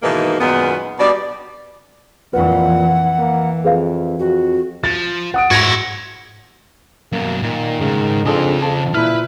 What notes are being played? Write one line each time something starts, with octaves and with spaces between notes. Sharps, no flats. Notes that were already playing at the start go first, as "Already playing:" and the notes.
G#2 B2 D#3 E3 A#3 D#4
F#2 A#2 D#3 G#3 B3
B2 G3 D5
F2 A#2 E3 B4 F#5
E3
A#3
F2 G#4 B4 F5
F2 F#4
F3 A6
F#5 D#6 D7
G#2 E4 F#4 G#6 A#6 F7
F#2 B2 A#3
A#2 D#3
C#2 G#2 C#3
F2 C#3 D4 G#4 A4 C6
F2 A5
A#2 E4 B4 F6